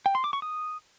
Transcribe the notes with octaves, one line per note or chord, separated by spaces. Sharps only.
G5
C6
D6
C#6
D#6